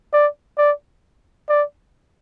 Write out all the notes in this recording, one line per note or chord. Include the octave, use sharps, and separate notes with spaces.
D5
D5
D5